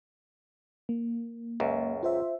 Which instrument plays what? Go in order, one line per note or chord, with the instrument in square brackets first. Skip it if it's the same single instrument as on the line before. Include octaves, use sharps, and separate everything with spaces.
[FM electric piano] A#3
[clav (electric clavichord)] C#2 F#2
[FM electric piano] F4 C5 E5